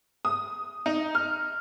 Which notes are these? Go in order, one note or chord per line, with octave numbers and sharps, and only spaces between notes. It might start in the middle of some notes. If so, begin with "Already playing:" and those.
D#6
D#4
F6